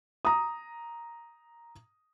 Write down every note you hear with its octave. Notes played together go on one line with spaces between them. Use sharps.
A#5 D#6